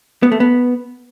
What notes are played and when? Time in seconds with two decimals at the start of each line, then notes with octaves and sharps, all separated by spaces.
0.23 B3
0.32 A3
0.40 B3